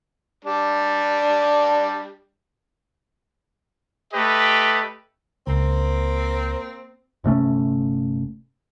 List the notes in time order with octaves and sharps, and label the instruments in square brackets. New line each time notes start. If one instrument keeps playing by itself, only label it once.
[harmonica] G3 D4
[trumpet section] A3 G4 B4 D#5
[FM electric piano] C#2 [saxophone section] A#3 C4
[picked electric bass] G1 C3 A3 C#4